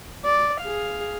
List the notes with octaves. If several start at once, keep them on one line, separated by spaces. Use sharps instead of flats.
D5
G#4 F5